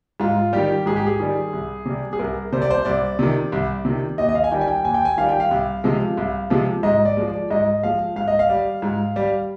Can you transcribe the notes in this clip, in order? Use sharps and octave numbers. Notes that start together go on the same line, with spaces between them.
G#2 F4
D#3 G3 G4
G#2 G#4
G4
G#4
D#3 G3
C2
C3 G3
G#4
C2 A#4
C3 G3 C5
D5
C5
C2 D5
C3 D#3
C2
C3 D#3
D#2 D#5
D#5
F5
G#5
D#3 G3 G5
G#5
G5
D#2 G#5
G5
G#5
D#3 G3 F5
G5
F5
C2
C3 F3 G#3
C2
C3 F3 G#3
G#2 D#5
D5
F3 G#3
D5
G#2 D#5
F3 G#3 F5
G#2 F5
D#5
F5
G3
G#2
G3